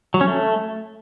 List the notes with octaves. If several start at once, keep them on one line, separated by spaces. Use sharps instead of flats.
F#3
C#4
A3